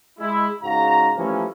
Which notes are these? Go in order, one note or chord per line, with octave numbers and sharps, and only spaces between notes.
G#3 E4
G#2 C#3 F#4 F5 A#5
E3 F3 G3 A3 A#3 C#4